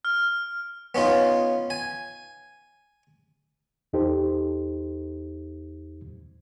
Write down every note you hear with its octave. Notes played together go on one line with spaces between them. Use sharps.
F6
B3 C#4 D#4 F4
G#5
E2 D#4 G4 A4 C5